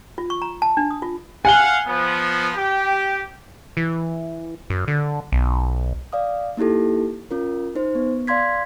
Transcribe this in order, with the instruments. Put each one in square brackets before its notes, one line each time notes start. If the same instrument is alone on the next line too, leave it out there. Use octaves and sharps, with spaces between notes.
[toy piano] F4
C#6
A#5
A5
D4
D#6
F4
[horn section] F5 F#5 [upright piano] G#5 G7
[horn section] F3 B3
G4
[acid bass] E3
F#2
D3
B1
[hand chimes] D5 F5 D#6
A#3 D#4 E4 G4 A4
C#4 F4 A#4
D#4 C5
B3
D5 F5 C6 G#6 B6